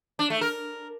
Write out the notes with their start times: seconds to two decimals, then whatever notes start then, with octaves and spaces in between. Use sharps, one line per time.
0.19 D4
0.30 A3
0.41 A#4